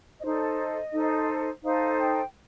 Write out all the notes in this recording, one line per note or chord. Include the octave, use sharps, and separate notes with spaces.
D#4 A4 C5 D#5
D5
D#5
D#4 A4 C5
D#4 A4 C5 F5
G5